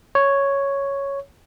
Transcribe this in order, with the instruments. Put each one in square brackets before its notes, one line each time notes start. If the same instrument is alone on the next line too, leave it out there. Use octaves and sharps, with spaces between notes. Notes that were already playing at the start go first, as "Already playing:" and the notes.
[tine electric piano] C#5